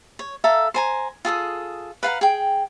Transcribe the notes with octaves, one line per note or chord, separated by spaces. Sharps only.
C#5
A4 E5 F5 A#5
C5 G#5 A#5
F4 G#4 A4 D#6
B4 F5 F#5 A#5
G#4 G5